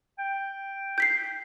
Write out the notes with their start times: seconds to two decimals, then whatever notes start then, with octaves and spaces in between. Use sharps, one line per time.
0.19 G5
0.98 G6 B6 C7